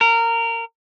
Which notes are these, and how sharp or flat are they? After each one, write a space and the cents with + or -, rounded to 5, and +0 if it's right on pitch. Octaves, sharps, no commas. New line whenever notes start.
A#4 -20